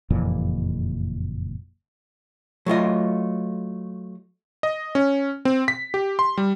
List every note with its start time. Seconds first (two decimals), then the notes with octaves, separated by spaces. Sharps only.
0.10 F#1 F2 A#2 E3
2.66 F#3 A3 F4 D#5
4.63 D#5
4.95 C#4
5.45 C4
5.68 B6
5.94 G4
6.19 C6
6.37 G3